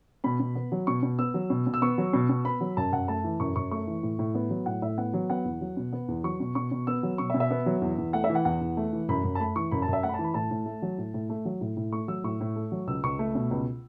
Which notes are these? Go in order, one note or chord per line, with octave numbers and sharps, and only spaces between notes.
B2 B5
B2
B3
F#3
B2 C#6
B2
B3 E6
F#3
B2
B2
E6
B3 C#6
F#3
B2
B2
B3 B5
F#3
F#2 A5
F#2 F#5
A3 A5
E3
F#2 C#6
F#2 C#6
A3 C#6
E3
A2
A2
B3
F#3
A2 F#5
A2 E5
B3 F#5
F#3
B3 F#5
E2
F#3
B2
B3
E2
F#3 C#6
B2
B2 C#6
B2
B3 E6
F#3
B2 C#6
E5
B2
E5
B3
F#3
E2
E2
A3 F#5
E5
E3
F#5
E2 F#5
E2
A3
E3
F#2 B5
F#2
A5
A3 B5
E3 C#6
F#2 B5
A5
F#2
E5
A3 F#5
B5
A5
E3
B5
A2 A5
A2
A3
F#3
A2
A2
A3
F#3
A2
A2
A3 C#6
F#3 E6
A2 C#6
A2
A3
F#3
C#2 E6
C#2 C#6
A3
B2
C#2